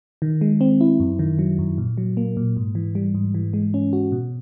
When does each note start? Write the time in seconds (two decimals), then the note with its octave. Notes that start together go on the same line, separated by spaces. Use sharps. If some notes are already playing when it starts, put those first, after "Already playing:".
0.22 D#3
0.41 G#3
0.61 C4
0.81 E4
1.00 F#2
1.19 D#3
1.39 F#3
1.59 F#2
1.78 A#2
1.98 F#3
2.17 A#3
2.37 A#2
2.57 G#2
2.75 E3
2.95 G3
3.15 G#2
3.35 E3
3.53 G#3
3.74 C#4
3.93 F#4
4.12 B2